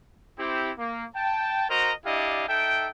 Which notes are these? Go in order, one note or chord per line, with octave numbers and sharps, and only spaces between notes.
C4 E4 G4
A#3
G5 A5
F#4 A#4 C5 D#5 A#5
D4 E4 G4 D5 D#5 F5
D#4 A4 E5 G5